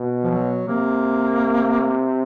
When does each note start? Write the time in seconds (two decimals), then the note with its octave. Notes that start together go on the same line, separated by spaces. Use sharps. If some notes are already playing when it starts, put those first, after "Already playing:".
Already playing: B2
0.24 F3
0.30 F#3
0.68 C3 A#3